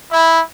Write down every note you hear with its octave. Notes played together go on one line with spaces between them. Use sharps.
E4